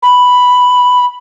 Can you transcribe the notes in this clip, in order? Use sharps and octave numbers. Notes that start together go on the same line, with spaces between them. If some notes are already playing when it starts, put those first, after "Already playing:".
B5